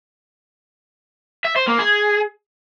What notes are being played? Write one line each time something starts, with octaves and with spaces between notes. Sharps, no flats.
E5
C5
A#3
G#4